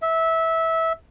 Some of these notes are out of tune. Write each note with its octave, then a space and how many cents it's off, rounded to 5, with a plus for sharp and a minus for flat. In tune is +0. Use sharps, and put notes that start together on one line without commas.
E5 -20